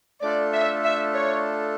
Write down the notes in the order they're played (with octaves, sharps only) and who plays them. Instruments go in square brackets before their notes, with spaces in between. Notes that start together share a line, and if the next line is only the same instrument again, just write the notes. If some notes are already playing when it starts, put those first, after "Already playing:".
[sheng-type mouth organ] A3 D4 F4 A4 [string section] D5
[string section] E5
E5
C#5